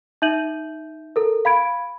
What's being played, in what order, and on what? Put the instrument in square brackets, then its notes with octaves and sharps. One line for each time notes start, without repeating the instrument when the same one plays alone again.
[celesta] D#4 E5 G6 D#7 F#7
A4 A#4
F5 B5 G#6 D7